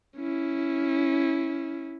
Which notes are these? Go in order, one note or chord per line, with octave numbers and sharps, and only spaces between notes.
C#4 E4